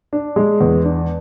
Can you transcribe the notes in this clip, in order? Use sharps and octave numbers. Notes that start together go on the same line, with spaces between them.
D4
G#3
E2
D4